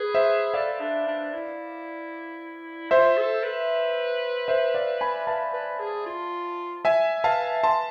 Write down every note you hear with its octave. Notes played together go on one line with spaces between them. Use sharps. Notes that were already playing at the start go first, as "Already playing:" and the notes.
Already playing: G#4 B4
C5 E5
A4 D5 F5
D4
D4
E4
F4 C5 E5
A4
B4
C5 E5
D5 F5
G#5 B5
B4 F5 A5
B4
G#4
F4
E5 G#5
B4 F5 A5
B4 A5 C6